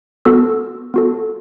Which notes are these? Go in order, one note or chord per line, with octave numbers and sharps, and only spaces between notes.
B3 F#4 A4 E6
B3 F#4 A4